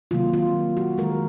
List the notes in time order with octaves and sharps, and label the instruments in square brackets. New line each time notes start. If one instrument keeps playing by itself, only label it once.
[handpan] C3 D#3 F#3 A#3 F4
F4
F#4
D#3 G#3 A#4